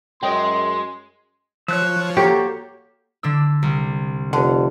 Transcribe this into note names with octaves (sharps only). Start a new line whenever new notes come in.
F#2 G#3 C#5 D#5 G5 C6
F3 C#5 E6 F#6
F#3 A#3 G4 A4 C5 C#6
D3 D4 E6
C2
F1 D3